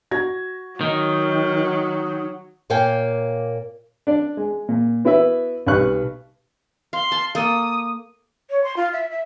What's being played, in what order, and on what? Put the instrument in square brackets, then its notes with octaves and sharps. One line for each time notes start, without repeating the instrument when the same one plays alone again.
[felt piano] F#4 G#6 A#6
[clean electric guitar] D#3 [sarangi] F#3 [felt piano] D#5
[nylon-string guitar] A#2 A#3 C#5 F5 G5 G#5
[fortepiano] D4 D5
G#3
A#2
B3 E4 F#4 B4 E5
B1 G3 B4 C#6 F#6
[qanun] F5 [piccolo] C6
[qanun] A5
[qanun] A#3 A4 [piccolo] D#6
[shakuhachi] C#5
C6
F4
E5
E5